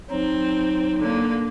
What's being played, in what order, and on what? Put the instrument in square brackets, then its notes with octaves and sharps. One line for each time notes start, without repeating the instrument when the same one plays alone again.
[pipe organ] F#3 D#4 [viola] C4
[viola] D3 A#3